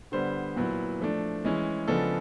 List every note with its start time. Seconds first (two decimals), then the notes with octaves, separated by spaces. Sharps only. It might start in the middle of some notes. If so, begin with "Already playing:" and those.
0.12 D3 G3 B3 C5
0.56 A#2 F#3 B3 E4
1.00 F3 A3 D4
1.44 E3 G#3 C#4 E4
1.88 C#3 F3 G#3 B3 D4 A4